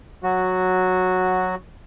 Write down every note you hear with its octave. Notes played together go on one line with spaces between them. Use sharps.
F#3 F#4